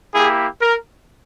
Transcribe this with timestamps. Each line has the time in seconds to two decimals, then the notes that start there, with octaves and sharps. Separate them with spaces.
0.14 A#3 E4 G4 G#4
0.61 A#4